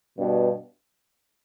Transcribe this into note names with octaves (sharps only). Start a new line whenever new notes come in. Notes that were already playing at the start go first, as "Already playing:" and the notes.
G2 B2